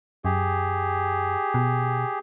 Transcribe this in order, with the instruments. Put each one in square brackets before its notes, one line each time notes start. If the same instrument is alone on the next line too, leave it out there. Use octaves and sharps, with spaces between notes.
[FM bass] F#2 [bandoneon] G4 G#4
[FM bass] B2